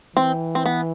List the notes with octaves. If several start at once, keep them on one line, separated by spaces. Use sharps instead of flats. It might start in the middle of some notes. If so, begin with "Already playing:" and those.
E3 C4
C4
B3